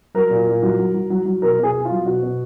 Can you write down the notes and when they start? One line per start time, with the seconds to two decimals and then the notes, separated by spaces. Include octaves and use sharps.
0.14 F#3 A#4
0.30 A#2
0.46 A#2
0.62 F#3
0.79 F#3
0.94 F#3
1.10 F#3
1.26 F#3
1.42 B2 A#4
1.59 B2 G#4
1.74 B2
1.85 F4
1.91 F#3
2.05 B2 F#4
2.22 B2